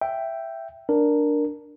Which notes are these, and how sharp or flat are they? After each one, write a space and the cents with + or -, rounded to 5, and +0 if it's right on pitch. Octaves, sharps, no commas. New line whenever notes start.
E5 +10 G5 -5
D4 +0 A#4 +0